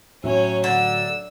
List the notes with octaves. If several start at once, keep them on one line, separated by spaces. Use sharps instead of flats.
A2 F#3 C#4 C#5
D3 E6